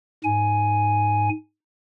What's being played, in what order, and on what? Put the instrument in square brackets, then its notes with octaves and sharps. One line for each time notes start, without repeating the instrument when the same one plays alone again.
[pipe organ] G#2 G#5